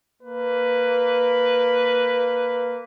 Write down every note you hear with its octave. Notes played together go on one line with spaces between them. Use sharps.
A#3 B4